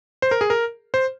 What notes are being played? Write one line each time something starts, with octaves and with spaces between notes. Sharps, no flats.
C5
A#4
G#4
A#4
C5